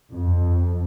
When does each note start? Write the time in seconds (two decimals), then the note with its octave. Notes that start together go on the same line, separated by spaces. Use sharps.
0.10 F2